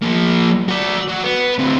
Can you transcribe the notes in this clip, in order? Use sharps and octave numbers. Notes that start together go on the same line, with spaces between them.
F3 A#3
F#4 D5
F#3
B3
D2 C4